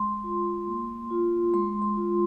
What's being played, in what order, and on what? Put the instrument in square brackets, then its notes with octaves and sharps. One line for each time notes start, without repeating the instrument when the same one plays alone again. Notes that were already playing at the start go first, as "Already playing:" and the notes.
Already playing: [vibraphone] G#3 C6
F4
A#3
F4
G#3 C6
C6
F4